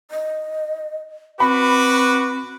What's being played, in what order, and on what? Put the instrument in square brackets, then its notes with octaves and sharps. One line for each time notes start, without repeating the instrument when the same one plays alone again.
[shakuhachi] D#5
[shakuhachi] C4 [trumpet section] F#4 B4 D6 [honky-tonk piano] B5